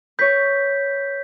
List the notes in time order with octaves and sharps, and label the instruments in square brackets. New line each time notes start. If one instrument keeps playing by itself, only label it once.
[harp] B4 C#5 [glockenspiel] G6 B6